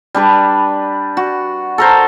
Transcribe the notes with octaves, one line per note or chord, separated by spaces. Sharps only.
G3 D4 B4
F#4
A4 A#4 C5